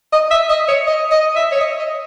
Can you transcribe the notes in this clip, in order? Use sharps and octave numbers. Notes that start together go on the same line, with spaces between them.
D#5
E5
D#5
C#5
D#5
D#5
E5
C#5
D#5
D#5